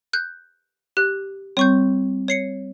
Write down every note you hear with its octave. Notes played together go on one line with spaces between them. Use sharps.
F#6 G6
G4 F#6
G3 C4 C#5 C#6 G6
C#5 C7 C#7